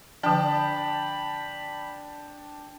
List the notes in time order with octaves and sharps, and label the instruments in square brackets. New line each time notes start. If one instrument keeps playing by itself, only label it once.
[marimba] D3 F3 [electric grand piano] D4 G5 A5 [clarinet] B5